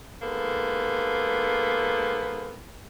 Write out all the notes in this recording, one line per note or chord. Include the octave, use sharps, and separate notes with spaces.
G#2 A#3 B3 A4